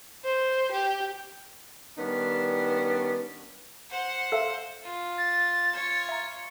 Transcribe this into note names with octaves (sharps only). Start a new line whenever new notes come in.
C5
G4
D#3 G3 B3 C#4 D4
C5 F#5
A4 E5 F5
F4
A6
F4 C#5
E5 A#5